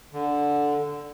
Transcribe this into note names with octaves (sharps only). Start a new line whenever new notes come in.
D3